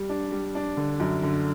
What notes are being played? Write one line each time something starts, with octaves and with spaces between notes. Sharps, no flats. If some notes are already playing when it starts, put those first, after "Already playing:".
Already playing: G3
D4
G3
D4
D3
F#2
D3